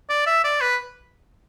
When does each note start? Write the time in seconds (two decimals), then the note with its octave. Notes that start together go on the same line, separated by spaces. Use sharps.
0.09 D5
0.27 E5
0.44 D5
0.61 B4